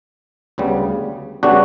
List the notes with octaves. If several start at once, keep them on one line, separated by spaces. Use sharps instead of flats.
D2 C#3 G3 B3
C#3 G3 B3 D4 F#4